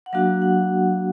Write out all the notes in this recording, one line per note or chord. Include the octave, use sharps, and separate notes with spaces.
F#5
F#3 A#3 D4 F#4 F5
F#5